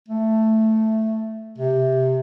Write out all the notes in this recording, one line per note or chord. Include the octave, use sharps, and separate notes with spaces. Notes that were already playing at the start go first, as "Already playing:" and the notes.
A3
C3